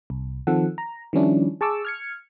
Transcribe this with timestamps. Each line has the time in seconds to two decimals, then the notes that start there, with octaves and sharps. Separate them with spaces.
0.10 C2
0.47 D#3 F3 C4 A4 F#5
0.78 A#5
1.13 D#3 F3 G3 C#4 D4 E4
1.61 G#4 A5 C#6 D6 E6
1.85 F6 G#6 C#7